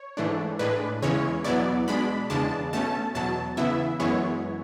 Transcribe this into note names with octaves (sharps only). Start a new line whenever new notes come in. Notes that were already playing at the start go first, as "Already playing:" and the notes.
Already playing: C#5
G#2 E3 A3 D4
A2 G#3 D4 B4
E2 C#3 E3 G#3 C#4 C#5
E2 B2 F#3 B3 E4 D5
B2 G#3 D4 B5
E2 C#3 G#3 D4 A5
B2 A3 C#4 A5
E2 B2 F#3 A5
C#3 E3 B3 E4 E5
F#2 E3 G#3 B3 E4 C#5